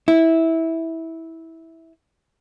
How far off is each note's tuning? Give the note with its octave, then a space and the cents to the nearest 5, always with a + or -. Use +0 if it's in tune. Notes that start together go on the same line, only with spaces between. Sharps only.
E4 -15